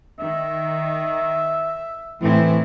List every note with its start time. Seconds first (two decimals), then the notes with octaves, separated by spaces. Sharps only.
0.19 D#3 E5
2.22 A2 E3 C4 E4